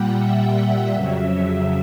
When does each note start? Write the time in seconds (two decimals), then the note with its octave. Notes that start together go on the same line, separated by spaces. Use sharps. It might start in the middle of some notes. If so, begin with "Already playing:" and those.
Already playing: A#2 G3 F#5 G5
0.18 E5
0.94 F2 C#3 F#3